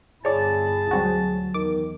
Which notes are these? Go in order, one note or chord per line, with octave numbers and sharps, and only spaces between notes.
G1 E4 G#4 C#5 D5 A5
D2 F#3 G3 C4 F#4
E2 D#3 D6